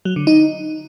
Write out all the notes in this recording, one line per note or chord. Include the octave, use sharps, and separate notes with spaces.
F#3
D3
D#4